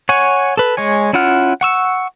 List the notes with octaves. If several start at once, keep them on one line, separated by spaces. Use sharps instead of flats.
C#5 F#5 G#5
A4 B4
G#3 C#5 G#5
C#4 E4 F4 F#5 F6
F#5 C#6 E6